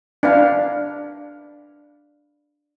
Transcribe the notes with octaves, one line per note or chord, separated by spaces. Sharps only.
D4 B4 F5